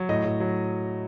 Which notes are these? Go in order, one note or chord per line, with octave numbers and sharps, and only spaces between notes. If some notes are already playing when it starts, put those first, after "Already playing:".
Already playing: F#3
A2 D#5
A2
F#3